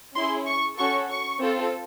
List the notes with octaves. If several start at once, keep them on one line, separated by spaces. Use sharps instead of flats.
C#4 E4 G#4 C6
C#6
C#4 F#4 A4 C#6
C#6
C4 F4 A4